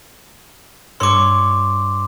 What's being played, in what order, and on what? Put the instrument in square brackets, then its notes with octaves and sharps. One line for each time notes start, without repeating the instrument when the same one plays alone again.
[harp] G2 C#5 E6 [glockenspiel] C6 D6